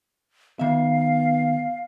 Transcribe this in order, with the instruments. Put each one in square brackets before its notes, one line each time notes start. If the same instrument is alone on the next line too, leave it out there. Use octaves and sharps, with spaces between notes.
[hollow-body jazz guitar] D#3 E5 [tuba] B3 [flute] F5